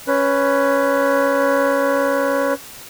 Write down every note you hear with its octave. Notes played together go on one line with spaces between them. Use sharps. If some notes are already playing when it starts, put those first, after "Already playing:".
C#4 B4